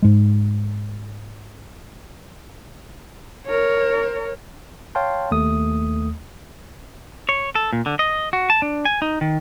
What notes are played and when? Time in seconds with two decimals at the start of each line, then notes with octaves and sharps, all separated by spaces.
0.02 G#2 G#3
3.46 A#4 C#5
4.95 C#5 F5 G5 A5 C6
5.31 D#2 A3 D#6
7.29 C#5
7.55 A4
7.73 A#2
7.86 D3
7.99 D#5
8.33 F#4
8.50 A5
8.62 D4
8.85 G#5
9.02 D#4
9.21 D#3